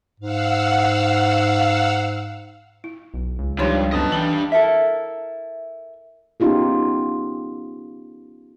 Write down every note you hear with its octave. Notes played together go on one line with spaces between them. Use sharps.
G#2 F5 F#5 E6
E4
B1
C#2
G2 F3 G3 D#4 C#5 C6
F#2 D3 B3 D#5 A5
E3 G3 D4 F#7 G7
E4 A4 A#4 E5
B3 C#4 D#4 F4 G4 G#4